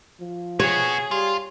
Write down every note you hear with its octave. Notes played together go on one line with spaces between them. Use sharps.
F3
B3 F#4 G#4 C#5
G3 F4